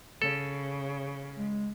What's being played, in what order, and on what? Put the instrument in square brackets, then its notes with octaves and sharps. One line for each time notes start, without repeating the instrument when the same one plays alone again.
[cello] C#3 [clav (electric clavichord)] A4
[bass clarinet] G#3